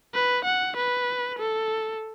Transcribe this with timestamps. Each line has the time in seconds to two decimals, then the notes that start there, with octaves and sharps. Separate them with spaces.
0.14 B4
0.45 F#5
0.76 B4
1.38 A4